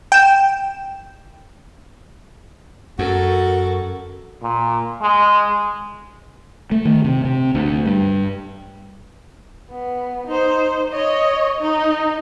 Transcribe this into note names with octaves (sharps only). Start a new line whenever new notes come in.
G5 E7
F#2 F#4 A4 A#4
A#2
G#3
A3
D#3
C3
C3
D2
G2
B3
D#4 C5
C#5 D#5
D#4